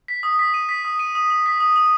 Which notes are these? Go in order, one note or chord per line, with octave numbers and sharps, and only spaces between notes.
B6
D#6
B6
D#7
B6
D#6
D#7
D#6
D#6
B6
D#6
D#6